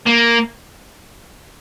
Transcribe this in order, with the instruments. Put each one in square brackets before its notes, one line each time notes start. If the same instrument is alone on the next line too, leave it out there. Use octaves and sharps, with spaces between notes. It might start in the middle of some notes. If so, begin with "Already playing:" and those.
[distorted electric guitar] A#3